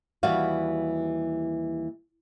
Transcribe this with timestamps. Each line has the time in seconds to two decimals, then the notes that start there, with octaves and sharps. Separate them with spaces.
0.23 D#2 E3 G3 F#4 F5